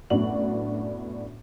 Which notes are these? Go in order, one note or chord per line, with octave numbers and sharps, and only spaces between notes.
F#2 A2 B3 D4 F#4 F#7